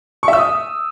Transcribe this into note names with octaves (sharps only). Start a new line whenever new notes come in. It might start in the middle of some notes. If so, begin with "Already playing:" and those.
C#6
E5
E6
D#6